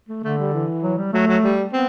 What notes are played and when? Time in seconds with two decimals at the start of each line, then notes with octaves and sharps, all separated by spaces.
0.09 A3
0.24 D3 A3
0.39 G3
0.54 E3
0.83 F#3
0.98 G3
1.13 F#3 A3
1.28 F#3
1.44 G3
1.73 B3 C4